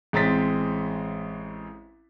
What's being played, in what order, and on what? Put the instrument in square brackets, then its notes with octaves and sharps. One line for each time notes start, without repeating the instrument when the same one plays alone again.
[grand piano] A1 G#3 C4 A#5 A6 B6